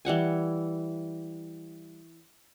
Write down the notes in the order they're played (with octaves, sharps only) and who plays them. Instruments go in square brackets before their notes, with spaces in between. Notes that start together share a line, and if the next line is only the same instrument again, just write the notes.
[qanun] E3 G3 F#5 G#5